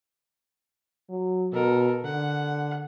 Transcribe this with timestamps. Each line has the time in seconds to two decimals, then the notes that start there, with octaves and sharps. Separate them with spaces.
1.09 F#3
1.53 B2 A4 A#4
2.05 D3 F#5